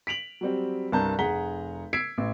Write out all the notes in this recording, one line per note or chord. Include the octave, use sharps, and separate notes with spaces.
B6 D7 F7 F#7
F#3 G3 C4
C2 G2 A5 A#5 G6
F1 G#4 F#5 A#5 B6 G7
E6 G#6 B6 C7 D7
A1